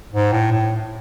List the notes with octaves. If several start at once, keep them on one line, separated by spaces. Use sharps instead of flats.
G#2
A2
A2